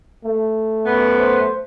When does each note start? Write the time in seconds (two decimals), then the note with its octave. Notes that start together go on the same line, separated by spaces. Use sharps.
0.24 A3
0.85 F#2 B3
1.18 C5